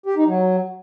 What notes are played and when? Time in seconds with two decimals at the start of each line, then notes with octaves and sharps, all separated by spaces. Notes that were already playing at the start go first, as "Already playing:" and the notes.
0.06 G4
0.16 D#4
0.27 F#3